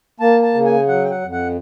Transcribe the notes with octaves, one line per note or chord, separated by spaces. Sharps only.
A#3 A5
A5
C#3
G#5
F#3 F#5
G5
F#5
F2
F#5